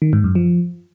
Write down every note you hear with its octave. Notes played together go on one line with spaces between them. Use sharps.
D#3
G#2
F#2
F3